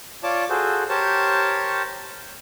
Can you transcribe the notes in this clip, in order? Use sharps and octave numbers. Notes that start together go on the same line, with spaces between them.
F4 C#5 D5 A5 D6
F#4 G#4 A4 C5
G4 A#4 C5 C#5 A5